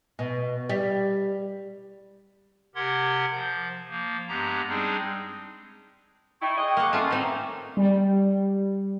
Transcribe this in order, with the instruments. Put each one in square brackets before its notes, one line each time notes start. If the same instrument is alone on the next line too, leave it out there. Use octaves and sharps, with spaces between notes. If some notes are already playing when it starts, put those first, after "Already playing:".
[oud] B2
G3
[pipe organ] C3 G4 A#4 F#5 C6 G#6
F3 G6
F3 A#3
G2 G#3 B3 G4 A#5
G3 G#3 C4 D4 D#4 G#4
[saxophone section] A3 D#4 E4 [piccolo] G5 [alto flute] C#6
[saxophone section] G#3 D#5
[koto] A#3 F#5 [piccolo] D6
[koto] A3 C#4 [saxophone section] F4
[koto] A2 C4 [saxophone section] D#4
[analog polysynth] G3